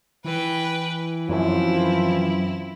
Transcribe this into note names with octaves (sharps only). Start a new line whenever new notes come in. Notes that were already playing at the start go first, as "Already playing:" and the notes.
E3 B4 G5
F#2 F3 C4 E4